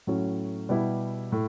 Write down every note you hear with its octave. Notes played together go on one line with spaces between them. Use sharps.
A2 F#3 C#4
B2 G3 B3 E4 G4
A2